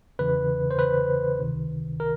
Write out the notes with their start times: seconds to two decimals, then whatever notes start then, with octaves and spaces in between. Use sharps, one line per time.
0.19 E2 C#3 E3 B4
0.71 C5
0.79 B4
1.39 C#2 C3 D#3
2.00 A#4